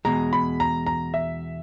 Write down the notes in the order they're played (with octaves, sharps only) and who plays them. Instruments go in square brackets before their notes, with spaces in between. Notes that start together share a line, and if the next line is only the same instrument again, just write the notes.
[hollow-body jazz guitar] E2 B2 G#3 [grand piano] A#5
[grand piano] B5
A#5
A#5
E5